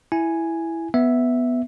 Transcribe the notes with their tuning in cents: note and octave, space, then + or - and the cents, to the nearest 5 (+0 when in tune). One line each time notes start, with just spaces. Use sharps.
E4 +0 G#5 +0
B3 +0 E5 +0